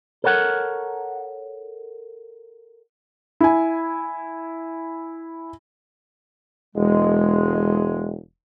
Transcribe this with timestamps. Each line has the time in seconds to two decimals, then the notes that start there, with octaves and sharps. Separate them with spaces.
0.24 A4 A#4 C#5 F#5
3.41 E4 G#5
6.76 E1 G#3